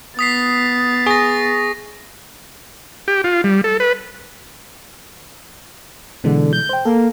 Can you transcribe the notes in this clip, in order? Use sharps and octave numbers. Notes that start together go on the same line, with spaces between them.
B3 D#6 A6 B6 C7
G#4 C#6 A#6
G4
F4
G3
A4
B4
B2 D3 E3 G#3
G6
C5 G5
A#3 A4